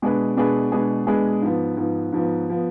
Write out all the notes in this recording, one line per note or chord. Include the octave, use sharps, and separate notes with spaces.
B2 G#3 D4 G#4 B4
B2 G#3 D4 G#4 B4
B2 G#3 D4 G#4 B4
B2 G#3 D4 G#4 B4
G#2 F3 B3
G#2 F3 B3
G#2 F3 B3
F3 B3